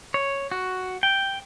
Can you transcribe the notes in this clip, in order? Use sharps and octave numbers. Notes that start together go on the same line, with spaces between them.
C#5
F#4
G5